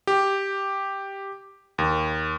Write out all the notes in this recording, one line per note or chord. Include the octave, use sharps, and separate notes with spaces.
G4
D#2